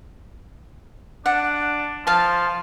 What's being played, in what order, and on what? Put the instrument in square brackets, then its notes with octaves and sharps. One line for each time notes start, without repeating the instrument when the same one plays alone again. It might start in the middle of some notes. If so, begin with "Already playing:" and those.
[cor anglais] D4 [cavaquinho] F#5
[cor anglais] F3 [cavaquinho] F5 A5